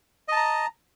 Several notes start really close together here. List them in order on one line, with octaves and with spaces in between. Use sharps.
D#5 A5 A#5